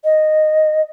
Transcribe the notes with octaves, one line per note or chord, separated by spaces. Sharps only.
D#5